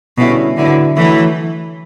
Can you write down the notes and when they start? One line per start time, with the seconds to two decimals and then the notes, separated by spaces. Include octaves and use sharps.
0.17 B2 D3 G3 C#4 E4
0.56 A2 D3 F#3 B3 E4
0.96 E3 F#3 A3 E4